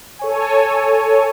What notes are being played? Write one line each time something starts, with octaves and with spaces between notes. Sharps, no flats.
A4 C#5 G#5